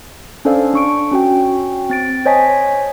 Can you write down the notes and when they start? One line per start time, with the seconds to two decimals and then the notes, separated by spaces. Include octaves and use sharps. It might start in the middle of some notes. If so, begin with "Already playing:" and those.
0.45 C#4 D4 A4 C5 D5 F5
0.73 D4 C#6 D7
1.12 C#4 F#4 G5
1.90 C4 A6 D7
2.26 C5 C#5 D#5 G#5 A5 B6